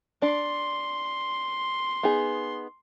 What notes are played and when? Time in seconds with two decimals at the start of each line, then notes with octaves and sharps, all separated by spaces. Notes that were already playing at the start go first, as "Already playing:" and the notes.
0.22 D4 C6
2.03 B3 D#4 G#4